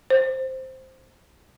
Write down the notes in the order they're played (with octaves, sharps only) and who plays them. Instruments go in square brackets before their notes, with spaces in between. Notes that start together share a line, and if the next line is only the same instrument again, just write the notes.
[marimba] C5